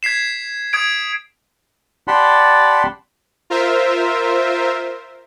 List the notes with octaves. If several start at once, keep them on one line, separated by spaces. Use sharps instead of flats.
G#6 B6 C7 E7
D#6 G#6 D7
G4 D5 F#5 A5 B5 C6
F4 A#4 C5 E5